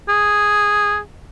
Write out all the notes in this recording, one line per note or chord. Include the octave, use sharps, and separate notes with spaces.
G#4